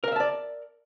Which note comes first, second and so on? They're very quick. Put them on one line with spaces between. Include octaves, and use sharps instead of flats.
A#4 F5 E5 A5 D5